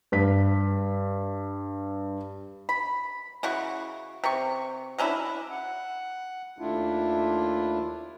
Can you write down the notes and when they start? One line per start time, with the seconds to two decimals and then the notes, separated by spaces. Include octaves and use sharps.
0.12 G2 B6
2.69 B5
3.43 C#3 E4 F#4 C#6
4.24 C3 C#6
4.98 F#3 C#4 D4 E4
5.50 F#5
6.59 D#2 A3 D4 E4 F4